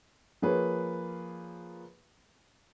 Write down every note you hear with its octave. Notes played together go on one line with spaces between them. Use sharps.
F3 A#3 G#4 B4 C#5